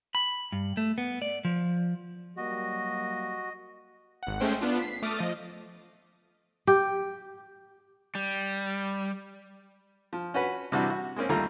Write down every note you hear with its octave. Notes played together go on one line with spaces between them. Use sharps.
B5
G2
A3
B3
D5
F3
F#3 G3 A#3 F#4 D#5
G#1 F#5
G#3 A3 C#4 C5 G5
B3 D4 F4
B6 C7
A3 D6 D#6 F6 A6
F3 D#5
G4
G3
F3
C#4 F#4 B4
C3 E3 G3 D4 F#4
F#4
G#3 A#3 C4 C#4
D#2 G3 A3 F4 A4 A#5